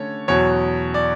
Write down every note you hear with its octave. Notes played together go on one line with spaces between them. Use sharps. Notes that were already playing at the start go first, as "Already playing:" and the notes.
Already playing: D3 A3 C#4 C#5
E2 B2 F#3 C#5
D5